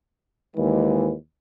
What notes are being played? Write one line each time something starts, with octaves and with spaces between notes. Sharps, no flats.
D#2 E3 G#3